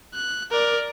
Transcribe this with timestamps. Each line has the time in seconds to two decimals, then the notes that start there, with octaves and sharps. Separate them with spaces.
0.14 F#6
0.51 A#4 D5